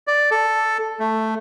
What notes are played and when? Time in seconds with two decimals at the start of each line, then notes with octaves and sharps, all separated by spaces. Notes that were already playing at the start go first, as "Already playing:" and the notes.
0.07 D5
0.31 A4
1.00 A3